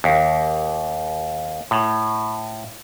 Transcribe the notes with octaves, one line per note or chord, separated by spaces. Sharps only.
D#2
A2